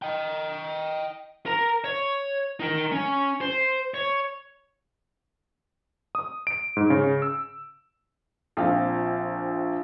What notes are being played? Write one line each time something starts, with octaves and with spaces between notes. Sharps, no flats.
D#5 G5
A#4 A#5
C#5
D#4 A#4
C#4
C5
C#5
D#6
D7
G#2
C#3
E6
A#1 F3 C4 F5 G5